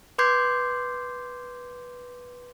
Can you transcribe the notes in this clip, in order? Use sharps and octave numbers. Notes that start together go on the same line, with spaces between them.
B4 C6 D6 G6 G#6 C7